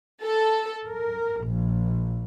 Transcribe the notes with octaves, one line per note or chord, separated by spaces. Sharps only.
A4
A#4
A#1